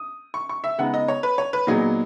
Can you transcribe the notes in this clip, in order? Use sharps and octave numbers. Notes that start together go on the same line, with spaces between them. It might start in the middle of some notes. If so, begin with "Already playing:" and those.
Already playing: D#6
C#6
C#6
E5
C#3 G#3 B3 D#4 F#5
D#5
C#5
B4
C#5
B4
A#2 F#3 B3 D#4 G#4